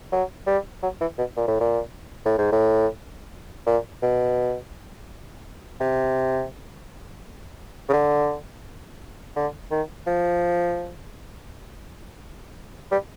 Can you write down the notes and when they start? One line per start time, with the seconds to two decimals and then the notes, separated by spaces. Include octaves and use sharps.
0.12 F#3
0.47 G3
0.83 F#3
1.01 E3
1.18 B2
1.37 A#2
1.48 A2
1.60 A#2
2.25 A2
2.38 G#2
2.52 A2
3.67 A#2
4.02 B2
5.80 C3
7.89 C#3
7.93 D3
9.36 D3
9.71 D#3
10.07 F3
12.91 G3